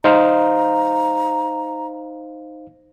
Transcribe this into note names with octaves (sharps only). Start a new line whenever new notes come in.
D#4 C5 F5 A#5